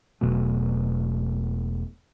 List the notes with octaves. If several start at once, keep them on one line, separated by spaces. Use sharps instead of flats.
E1 B2 F#3 A3